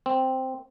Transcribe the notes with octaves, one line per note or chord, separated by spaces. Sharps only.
C4